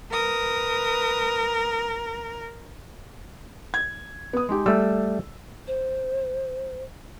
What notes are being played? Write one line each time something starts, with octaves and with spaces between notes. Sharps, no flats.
A#4 B4 D#6
G#6
B3 D#6
G#3 D#4 G4
G3 A3 E6
C5